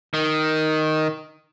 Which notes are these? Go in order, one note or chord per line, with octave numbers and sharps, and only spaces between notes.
D#3